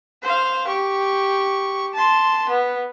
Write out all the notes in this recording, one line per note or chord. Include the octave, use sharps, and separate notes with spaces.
C5 F5
G4 C#6
A5 C6
B3